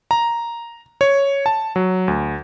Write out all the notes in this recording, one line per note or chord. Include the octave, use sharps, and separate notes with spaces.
A#5
C#5
A5
F#3
D2